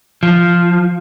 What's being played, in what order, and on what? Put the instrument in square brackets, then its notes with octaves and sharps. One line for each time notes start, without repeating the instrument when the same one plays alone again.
[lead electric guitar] F3